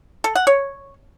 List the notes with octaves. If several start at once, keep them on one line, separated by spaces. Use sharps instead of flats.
A4
F#5
C#5